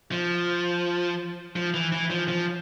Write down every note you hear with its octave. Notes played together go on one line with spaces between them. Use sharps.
F3
F3
E3
E3
F3
F3